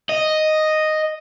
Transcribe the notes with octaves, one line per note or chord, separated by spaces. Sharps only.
D#5